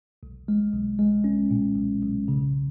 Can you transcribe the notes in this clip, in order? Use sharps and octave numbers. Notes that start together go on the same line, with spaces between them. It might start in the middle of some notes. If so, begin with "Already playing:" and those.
B1
G#3
B1
G#3
C#4
A#2
B1
B1
C#3